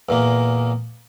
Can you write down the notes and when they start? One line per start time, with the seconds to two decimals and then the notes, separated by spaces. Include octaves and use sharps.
0.09 E2 A#2 A#3